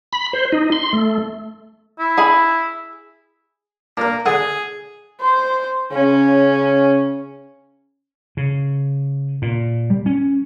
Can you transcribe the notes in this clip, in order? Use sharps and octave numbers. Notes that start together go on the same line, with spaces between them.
B5
C5
D#4
C6
A3
E4
G#4 B5
A#3 D4 A#4
D3 G#4 A4 F#5
C5
C#3 C#4
C#3
A#2
G3
C#4